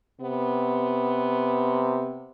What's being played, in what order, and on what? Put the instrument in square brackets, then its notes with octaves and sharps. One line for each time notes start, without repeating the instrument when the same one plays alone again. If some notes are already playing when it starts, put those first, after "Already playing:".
[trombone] C3 [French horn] B3